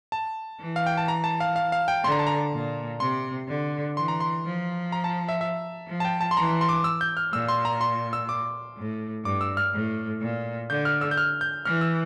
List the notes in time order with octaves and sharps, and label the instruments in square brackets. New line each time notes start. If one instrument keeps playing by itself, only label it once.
[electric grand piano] A5
[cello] E3
[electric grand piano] F5
G5
A5
A#5
A5
F5
F5
F5
G5
[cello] D3 [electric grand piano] C6
[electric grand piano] A#5
A5
A#5
[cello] A#2
[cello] C3 [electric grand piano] C6
[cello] D3
[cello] E3 [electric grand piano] C6
[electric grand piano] A#5
C6
[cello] F3
[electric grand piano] A#5
A5
E5
E5
[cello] F3
[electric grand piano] A5
G5
A5
C6
[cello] E3 [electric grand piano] A#5
[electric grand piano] C6
D6
E6
G6
F6
[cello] A#2 [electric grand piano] E6
[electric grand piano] C6
A#5
C6
E6
D6
[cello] A2
[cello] G2 [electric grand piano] D6
[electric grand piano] E6
F6
[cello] A2
A#2
[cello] D3 [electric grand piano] G6
[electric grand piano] F6
E6
G6
F6
G6
[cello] E3 [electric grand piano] F6
[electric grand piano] E6